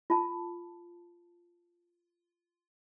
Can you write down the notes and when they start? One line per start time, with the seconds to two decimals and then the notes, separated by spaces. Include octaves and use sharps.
0.10 F4 A5